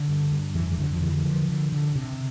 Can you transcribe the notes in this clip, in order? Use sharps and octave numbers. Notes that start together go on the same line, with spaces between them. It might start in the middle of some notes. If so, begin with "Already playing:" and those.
Already playing: D3
G2
G2
F2 E3
E3
F2 D3
F3
D3 E3
D3 F3
D3
D3
C3